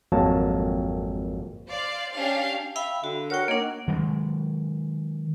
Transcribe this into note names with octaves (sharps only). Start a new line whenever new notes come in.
G#1 F2 F#3 A#3 A5
C5 D5 F5
C#4 D4 G4 F5
E5 F5 G5 B5
D3 F#4
F#4 A#4 C#5 F#5 G5
A#3 D4 D#4 A#4 C#5 F#5
D#3 F#3 G#3